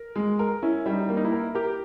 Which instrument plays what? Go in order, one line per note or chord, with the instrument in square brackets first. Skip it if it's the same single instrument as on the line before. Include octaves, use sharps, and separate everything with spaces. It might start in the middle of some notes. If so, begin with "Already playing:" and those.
Already playing: [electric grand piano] A#4
[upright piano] G#3
A#4
[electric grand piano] C#4 [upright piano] E4
[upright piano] G3
[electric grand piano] D#4
[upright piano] A#3
[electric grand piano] D#4
E4
[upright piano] A#4
[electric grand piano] G4 [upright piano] A#4